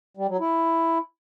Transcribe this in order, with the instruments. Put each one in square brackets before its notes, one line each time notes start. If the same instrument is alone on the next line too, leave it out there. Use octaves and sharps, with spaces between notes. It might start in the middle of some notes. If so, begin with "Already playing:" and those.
[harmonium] G3
F#3
E4